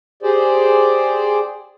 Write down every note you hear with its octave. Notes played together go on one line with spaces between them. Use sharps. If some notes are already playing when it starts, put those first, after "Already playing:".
G4 G#4 C5 D5